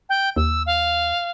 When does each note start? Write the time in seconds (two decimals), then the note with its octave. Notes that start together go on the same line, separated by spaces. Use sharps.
0.09 G5
0.36 D#2 E6
0.66 F5